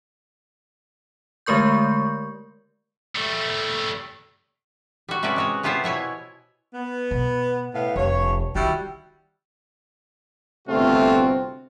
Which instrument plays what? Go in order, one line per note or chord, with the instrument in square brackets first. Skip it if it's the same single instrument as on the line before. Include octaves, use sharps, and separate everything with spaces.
[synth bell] D3 G#3 A3 A#4 C#6 G6
[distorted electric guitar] G3 A3
[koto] G3 F#4
C3 C#4 F#4 B4 D5
G#3 F#4 C#5
C3 B3 F4 G4 C5 C#5
B2 E4 C#5 G#5
[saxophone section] B3
[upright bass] B2
[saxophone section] A2 B3 F5
[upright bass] F1 [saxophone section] G2 C#5
[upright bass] D#3 [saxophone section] G3 E4 F#4
[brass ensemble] G1 C3 A3 C4 F4 F#4